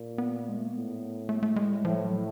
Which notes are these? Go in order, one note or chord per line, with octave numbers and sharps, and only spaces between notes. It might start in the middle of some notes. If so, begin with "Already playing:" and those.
Already playing: A#2
B3
G#3
A3
A#3
A2 B3
A3
A3
G#3
G3
A2 F3
F#3